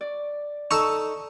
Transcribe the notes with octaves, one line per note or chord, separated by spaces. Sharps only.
D5
D#4 A4 C#6 E6